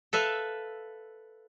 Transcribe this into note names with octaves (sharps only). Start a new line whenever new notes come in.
A4 B4 E5 F5